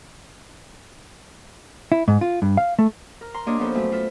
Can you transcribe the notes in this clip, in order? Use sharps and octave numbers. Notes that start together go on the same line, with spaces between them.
E4
G#2
F4
G2
F5
A3
A#4
A#5 C6
A#3 D4 G4 C#5 D#5
F3 A#3 B3 C#4 A4 C5
F#2 A3 E5
F4 A4 E5